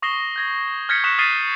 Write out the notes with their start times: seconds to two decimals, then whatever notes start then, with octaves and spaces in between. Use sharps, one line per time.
0.02 C#6 D#6 A#6 C7 E7 G7
0.36 G6 G#6 A#6
0.89 F6 G6 G#6 A#6 B6 C#7
1.04 C#6 D#6 F#6 B6 C#7 E7
1.18 D#6 F6 G#6 A6 C7 D#7